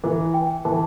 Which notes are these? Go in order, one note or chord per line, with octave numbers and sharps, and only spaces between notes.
E3 E4
G5
E3 A5